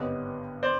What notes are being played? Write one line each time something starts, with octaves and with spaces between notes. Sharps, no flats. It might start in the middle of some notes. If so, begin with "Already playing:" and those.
Already playing: G#1 G2 D3 G3 B3 C#5 D#5
C5 D5